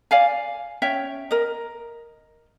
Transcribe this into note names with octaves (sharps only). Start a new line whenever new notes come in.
D5 F5 G#5
C#4 C#5 E5 G5
A#4 D#5